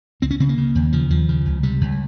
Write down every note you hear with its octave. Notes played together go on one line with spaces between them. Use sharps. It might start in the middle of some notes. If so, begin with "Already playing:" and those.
C#2 C4
C#4
C#3 C4
A#3
C#3
D#2
C#3 F3
D#2 F3
C#3
C#2
C3 G3
C#2